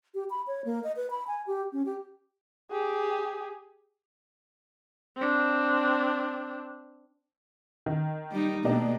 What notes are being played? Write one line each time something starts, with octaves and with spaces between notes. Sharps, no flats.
G4
B5
C#5
A#3
D#5
B4
B5
G#5
G4
C#4
G4
G4 G#4
C4 D4
D#3
G3 D#4
B2 A3 A#3 D4 D#4 G4